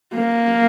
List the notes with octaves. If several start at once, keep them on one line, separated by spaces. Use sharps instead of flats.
A#3